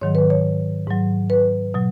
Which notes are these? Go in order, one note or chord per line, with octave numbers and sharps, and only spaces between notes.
G#2 D#3 F#3 C#5
B4
C#5
G#2 F#3
B4
B2 F#3